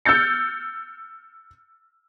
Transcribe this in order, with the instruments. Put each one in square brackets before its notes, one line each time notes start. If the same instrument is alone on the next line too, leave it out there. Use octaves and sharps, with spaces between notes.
[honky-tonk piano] E6 F6 G6 A6 C#7